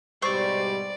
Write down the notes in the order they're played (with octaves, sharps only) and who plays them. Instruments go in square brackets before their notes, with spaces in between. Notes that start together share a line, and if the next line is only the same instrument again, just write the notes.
[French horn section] G#2 B2 G3 [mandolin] C5 C#6 E6 [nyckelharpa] D5